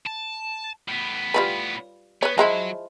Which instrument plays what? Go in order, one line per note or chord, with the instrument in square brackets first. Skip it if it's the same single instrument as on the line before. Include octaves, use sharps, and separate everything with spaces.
[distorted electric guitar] A5
A2 B3
[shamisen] G3 F4 B4
[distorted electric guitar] B3 [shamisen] B4 C#5
[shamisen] F3 G#3 E4 [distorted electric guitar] F#3